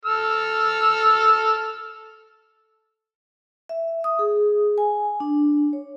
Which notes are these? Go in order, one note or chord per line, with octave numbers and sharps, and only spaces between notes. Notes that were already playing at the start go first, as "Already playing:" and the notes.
A4 E6 F6
E5
D#6
G#4
G#5
D4
C#5